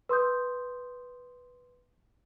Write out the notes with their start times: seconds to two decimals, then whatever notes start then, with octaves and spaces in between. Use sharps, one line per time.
0.09 B4 C6 D#6 G6